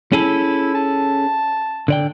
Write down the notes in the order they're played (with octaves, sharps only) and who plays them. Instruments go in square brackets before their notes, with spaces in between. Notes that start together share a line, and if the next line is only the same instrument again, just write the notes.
[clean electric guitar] C#4 G#4 A4 [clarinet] E4
[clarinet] A5
[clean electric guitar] D3 D5 G5